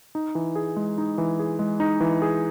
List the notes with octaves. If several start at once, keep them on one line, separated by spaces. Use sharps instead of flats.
D#4
E3
G#4
G#3
D#4
E3
G#4
G#3
D#4
E3
G#4